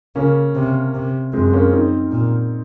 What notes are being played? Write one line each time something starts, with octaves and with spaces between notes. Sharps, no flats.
C#3 A#3 C#4
C3
C3
F#2 G#3 C4
A#3 C#4
C4 D#4
A#2